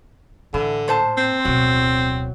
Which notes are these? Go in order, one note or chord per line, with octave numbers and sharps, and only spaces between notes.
A2 D3 E3
A#2 C5 A5
C4
D1 B2 F#3